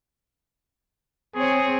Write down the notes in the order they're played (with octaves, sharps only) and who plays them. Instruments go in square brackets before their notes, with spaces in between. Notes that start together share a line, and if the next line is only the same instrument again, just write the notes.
[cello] C4 C#5 [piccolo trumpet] G#4